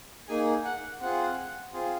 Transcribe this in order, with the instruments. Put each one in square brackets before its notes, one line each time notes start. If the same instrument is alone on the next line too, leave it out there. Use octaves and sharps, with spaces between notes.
[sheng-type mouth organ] A#3 D#4 G#4 G#5
F#5
C4 F4 G#4 F#5
C4 F4 G#4